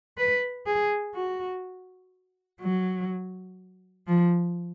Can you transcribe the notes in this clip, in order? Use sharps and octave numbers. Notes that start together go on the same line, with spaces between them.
B4
G#4
F#4
F#3
F3